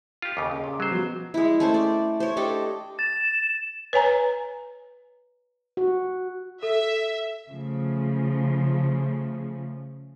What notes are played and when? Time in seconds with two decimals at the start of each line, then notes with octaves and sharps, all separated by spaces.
0.22 F4 G4
0.37 D#2 C#3 D6
0.51 D#2 C#3
0.64 A#2
0.80 F#3 G3 C5
0.91 B2 F3
1.34 G#3 E4
1.60 A3 C#4 C5
1.74 D5
2.20 C5 C#5
2.37 D4 G4 A4 D#5
2.99 A6 E7
3.93 B4 C#5 G#5 A#5
5.77 F#4
6.63 A4 E5
7.50 C#3 F3 A3